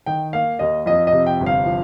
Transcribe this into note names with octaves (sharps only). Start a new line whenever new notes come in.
D#3 G5
A#3 F5
D#2 D#5
F2 D#5
D#5
C3
G5
G1
F5
F3